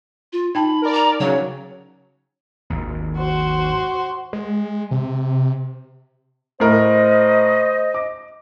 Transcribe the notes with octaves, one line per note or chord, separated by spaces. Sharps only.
F4
D#4 G5 A5 B5
A#4 D5
A#5
C#3 F#3 C#5
G#1 D#2
F#4 C5
G#3
C3
A2 A#4 C5 D#5
D6